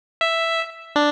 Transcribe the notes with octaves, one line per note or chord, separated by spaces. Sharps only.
E5
D4